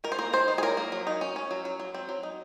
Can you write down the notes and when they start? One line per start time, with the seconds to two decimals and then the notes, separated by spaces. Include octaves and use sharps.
0.04 D#3 A#4
0.12 C5
0.19 A#3 A#4
0.33 D#3 C5
0.48 D#4
0.58 G#4
0.63 F#3 A#4
0.77 A#3
0.92 F#3
1.07 D#4
1.21 C#4
1.36 C#4
1.51 F#3
1.65 F#3
1.80 F#3
1.94 C4
2.09 F#3
2.23 D#4